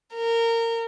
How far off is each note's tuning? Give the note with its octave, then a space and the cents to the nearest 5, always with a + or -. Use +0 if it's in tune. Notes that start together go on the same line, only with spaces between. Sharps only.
A#4 -20